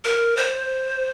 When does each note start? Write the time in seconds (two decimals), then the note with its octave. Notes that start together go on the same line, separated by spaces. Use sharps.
0.05 A#4
0.37 C5